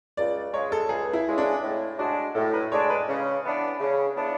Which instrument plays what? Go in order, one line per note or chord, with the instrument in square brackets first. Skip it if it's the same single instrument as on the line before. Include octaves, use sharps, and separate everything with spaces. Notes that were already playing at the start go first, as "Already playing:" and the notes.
[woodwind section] C#2 [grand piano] D5
[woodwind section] C#3 G#3 [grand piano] C#5
[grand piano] A4
[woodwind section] C#2 [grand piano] G#4
[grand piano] E4
[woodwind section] C#3 G#3
[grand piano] D4
[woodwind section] A2
[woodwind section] G#3 D4 [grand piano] F#4
[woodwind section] A2 [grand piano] A4
[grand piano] B4
[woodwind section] G#3 D4 [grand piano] C#5
[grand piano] B4
[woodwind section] C#3
E3 B3 D4
C#3
E3 B3 D4